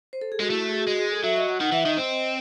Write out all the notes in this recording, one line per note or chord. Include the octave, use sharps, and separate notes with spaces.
C5
A4
G#4
G#3 F#4
A3 E4
F#4
G#4
F#4
G#3 F#4
G#4
A4
F#3 E5
D#5
F#5
D#3 F#5
E3 E5
D#3 D#5
C4